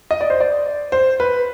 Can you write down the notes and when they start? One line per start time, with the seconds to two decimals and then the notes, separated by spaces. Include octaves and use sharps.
0.11 D#5
0.21 D5
0.30 C5
0.40 D5
0.92 C5
1.20 B4